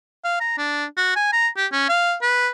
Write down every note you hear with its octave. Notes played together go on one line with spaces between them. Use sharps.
F5
A#5
D4
F#4
G#5
A#5
G4
C#4
F5
B4